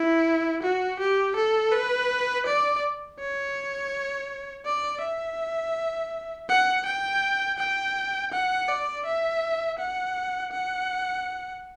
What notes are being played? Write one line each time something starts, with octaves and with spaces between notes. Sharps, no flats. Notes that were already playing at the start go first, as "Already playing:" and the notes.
Already playing: E4
F#4
G4
A4
B4
D5
C#5
D5
E5
F#5
G5
G5
F#5
D5
E5
F#5
F#5